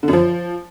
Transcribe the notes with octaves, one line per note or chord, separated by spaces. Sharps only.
D3
F#2
F3